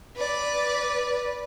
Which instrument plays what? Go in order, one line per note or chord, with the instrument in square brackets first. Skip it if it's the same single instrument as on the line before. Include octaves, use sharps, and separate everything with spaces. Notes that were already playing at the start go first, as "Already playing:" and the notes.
[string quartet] B4 D5